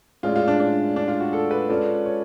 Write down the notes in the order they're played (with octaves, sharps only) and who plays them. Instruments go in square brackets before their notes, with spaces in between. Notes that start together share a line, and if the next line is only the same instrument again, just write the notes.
[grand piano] A2 G#3 C#4 G#4 D5 [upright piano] F4
[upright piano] F4
D4
D4
D4
F4
F#4
A4
B4
[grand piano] G#3 C#4 F4 A4 D5
[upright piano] C#5